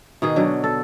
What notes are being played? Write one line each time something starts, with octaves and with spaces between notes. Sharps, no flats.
B2 D#3 G#4
D3 F#3
A4